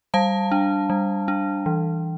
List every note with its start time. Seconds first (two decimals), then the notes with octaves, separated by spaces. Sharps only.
0.14 G3 F5 A5
0.52 D4
0.90 G3
1.28 D4
1.66 E3